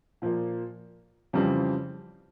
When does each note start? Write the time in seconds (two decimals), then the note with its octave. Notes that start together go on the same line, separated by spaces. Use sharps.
0.22 A#2 F3 A#3
1.33 F2 C#3 E3 G3 C4